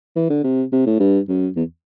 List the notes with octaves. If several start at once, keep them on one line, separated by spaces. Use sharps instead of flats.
E3
D3
C3
C3
A2
G2
F#2
E2